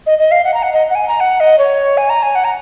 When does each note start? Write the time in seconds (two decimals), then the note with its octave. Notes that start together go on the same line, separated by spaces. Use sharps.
0.06 D#5
0.19 D#5
0.31 F5
0.44 F#5
0.54 A#5
0.63 F#5
0.73 D#5
0.90 F#5
0.95 G#5
1.08 A#5
1.20 F#5
1.40 D#5
1.59 C#5
1.97 G#5
2.10 A#5
2.23 G#5
2.35 F#5
2.44 A#5